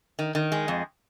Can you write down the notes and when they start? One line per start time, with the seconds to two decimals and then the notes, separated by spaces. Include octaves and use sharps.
0.19 D#3
0.35 D#3
0.52 G#3
0.68 F2